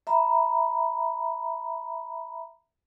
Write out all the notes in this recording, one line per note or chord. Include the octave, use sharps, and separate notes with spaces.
E5 A#5 B5